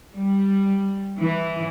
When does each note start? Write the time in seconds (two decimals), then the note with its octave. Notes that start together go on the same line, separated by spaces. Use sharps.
0.14 G3
1.19 E3